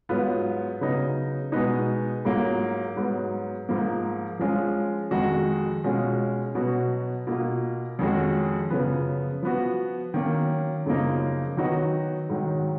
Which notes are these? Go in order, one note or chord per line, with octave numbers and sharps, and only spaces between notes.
G#2 F#3 B3 F4
C#3 F#3 B3 D#4
B2 G#3 B3 D#4
G#2 F#3 A#3 F4
G#2 F#3 B3
G#2 F3 A#3
F3 G#3 C#4 F4
F2 D#3 G#3 D#4 F#4
B2 G#3 C#4 F4
B2 F#3 B3 F#4
B2 A#3 F4
F2 D#3 G#3 C#4 F#4
F#2 C#3 F3 B3
F3 B3 F#4
D#3 F#3 A#3 C#4
F#2 C#3 F3 A#3 D#4
D#3 F#3 B3 D#4 F#4
G#2 D#3 F#3